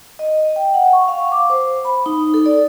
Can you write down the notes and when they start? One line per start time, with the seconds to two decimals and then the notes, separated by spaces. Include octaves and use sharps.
0.19 D#5
0.56 G5
0.74 F#5
0.93 C#6
1.08 F5
1.32 D6
1.50 C5
1.85 B5
2.06 D#4
2.34 A4
2.46 D5